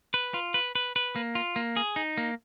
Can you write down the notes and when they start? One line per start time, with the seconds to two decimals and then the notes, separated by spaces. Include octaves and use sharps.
0.14 B4
0.34 F4
0.54 B4
0.75 B4
0.96 B4
1.16 A#3
1.35 F4
1.56 A#3
1.76 G#4
1.96 D#4
2.18 A#3